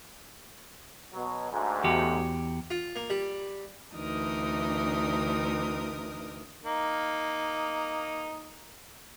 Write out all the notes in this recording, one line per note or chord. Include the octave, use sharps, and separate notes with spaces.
B2 F#3
D2 G#2
E2 F#4 G4
F4
A#3
G3
D2 E3 D4 D#4 A#4 D#6
A#3 D#4